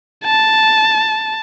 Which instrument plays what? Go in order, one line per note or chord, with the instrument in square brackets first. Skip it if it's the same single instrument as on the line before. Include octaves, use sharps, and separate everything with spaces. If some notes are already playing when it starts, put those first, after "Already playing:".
[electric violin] A5